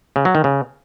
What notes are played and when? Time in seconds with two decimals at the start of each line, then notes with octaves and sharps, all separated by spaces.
0.16 C#3
0.25 F#3
0.35 D#3
0.44 C#3